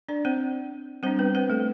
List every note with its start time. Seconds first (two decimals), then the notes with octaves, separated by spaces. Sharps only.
0.09 D4 D5
0.25 C4 C5
1.03 G3 C4 C5
1.06 D4
1.19 B3 B4
1.35 C4 C5
1.50 A3 A4